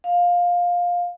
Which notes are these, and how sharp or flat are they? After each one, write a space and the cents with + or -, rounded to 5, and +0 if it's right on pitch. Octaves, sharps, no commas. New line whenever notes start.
F5 +15